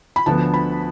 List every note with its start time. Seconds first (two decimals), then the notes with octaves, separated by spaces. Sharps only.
0.16 B5
0.26 D2 D3 F3 B3 A5
0.54 B5